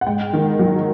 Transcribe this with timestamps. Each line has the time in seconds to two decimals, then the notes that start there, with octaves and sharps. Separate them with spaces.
0.01 F#5
0.06 G#2 G5
0.33 D#3
0.59 F#3